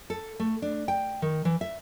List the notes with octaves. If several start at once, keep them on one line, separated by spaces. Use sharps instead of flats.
A4
A3
D4
G5
D#3
E3
E5